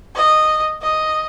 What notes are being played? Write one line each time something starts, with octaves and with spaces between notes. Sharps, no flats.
D#5
D#5